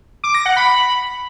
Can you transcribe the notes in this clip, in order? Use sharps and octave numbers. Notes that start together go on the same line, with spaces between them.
D6
A#6
F#5
B5